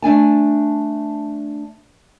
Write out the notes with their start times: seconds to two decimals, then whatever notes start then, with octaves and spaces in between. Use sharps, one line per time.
0.02 A3 D4 G#5 A5